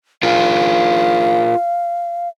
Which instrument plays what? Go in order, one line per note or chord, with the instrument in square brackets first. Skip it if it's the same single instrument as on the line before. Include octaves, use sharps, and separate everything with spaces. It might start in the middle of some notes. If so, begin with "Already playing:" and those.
[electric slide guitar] F4 G#4 A#4 [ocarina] F5